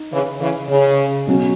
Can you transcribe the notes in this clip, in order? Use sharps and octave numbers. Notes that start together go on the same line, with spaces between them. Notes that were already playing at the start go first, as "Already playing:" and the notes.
Already playing: D#4
C#3 E3
C#3 E3
C#3
B2 F#3 C#4 F#4